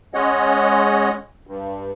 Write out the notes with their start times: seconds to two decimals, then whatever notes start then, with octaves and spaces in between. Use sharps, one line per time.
0.14 G#3 C#4 C#5 D#5 F#5
1.47 G2